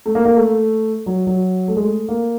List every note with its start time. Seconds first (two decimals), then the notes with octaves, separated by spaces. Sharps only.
0.06 A3
0.15 A#3
0.25 A#3
0.37 A3
1.06 F#3
1.27 F#3
1.68 A3
1.76 G#3
1.84 A3
2.09 A#3